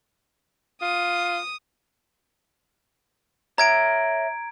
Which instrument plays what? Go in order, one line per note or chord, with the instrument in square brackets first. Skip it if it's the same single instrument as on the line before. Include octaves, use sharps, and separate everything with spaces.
[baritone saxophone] F4 [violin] D#6
[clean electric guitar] C#5 E5 [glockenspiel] A#5 G#6 D7